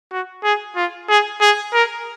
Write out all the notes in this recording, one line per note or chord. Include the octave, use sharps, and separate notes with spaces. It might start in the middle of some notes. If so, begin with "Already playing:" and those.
F#4
G#4
F4
G#4
G#4
A#4